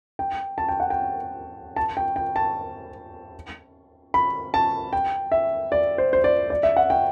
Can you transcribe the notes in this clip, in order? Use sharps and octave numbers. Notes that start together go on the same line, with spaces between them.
G5
A5
G5
F#5
G5
A5
G5
G5
A5
B5
A5
G5
E5
D5
C5
C5
D5
D5
E5
F#5
G5